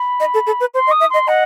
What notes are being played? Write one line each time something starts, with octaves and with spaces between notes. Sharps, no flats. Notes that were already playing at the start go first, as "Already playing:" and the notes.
Already playing: B5
D#5
A4
A4
B4
C5 C6
D#5
D#6
E5
D#5 C6
D#5 F#5